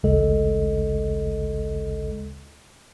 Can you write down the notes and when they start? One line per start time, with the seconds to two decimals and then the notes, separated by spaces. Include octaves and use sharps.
0.03 A1 D2 C#3 G#3 A4 D#5